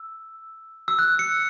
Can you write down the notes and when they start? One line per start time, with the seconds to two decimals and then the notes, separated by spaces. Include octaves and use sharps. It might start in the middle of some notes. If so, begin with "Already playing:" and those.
Already playing: E6
0.88 E6
0.99 F#6
1.19 C#7